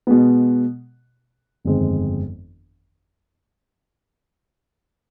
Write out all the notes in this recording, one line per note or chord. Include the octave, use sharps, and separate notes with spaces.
B2 G#3 B3
G1 F2 D#3 G#3 C4